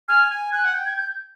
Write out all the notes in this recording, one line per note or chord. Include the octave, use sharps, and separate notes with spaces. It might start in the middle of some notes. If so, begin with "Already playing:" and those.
G#5 F6
G#5
G#5 F#6
F#5
G5
G#6
G6